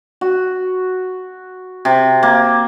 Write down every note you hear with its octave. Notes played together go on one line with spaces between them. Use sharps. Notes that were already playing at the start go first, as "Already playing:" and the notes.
F#4
C3
A#3